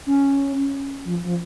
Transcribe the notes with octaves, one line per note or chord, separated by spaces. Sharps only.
C#4
F3
F3